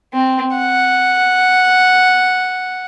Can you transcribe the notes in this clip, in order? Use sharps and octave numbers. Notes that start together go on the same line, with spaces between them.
C4
F#5